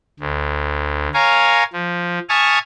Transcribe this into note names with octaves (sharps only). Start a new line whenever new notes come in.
D2
A#4 C#5 F5 G#5 A#5
F3
E5 G#5 A5 C#6 D#6 F6